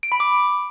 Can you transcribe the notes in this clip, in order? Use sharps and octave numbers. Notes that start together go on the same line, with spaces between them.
D7
B5
D6